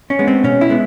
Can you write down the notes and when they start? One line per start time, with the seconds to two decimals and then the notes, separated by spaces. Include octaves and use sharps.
0.10 C#4
0.19 G#3 B3
0.28 C4
0.44 B2 C#4
0.61 E4
0.70 G#3 B3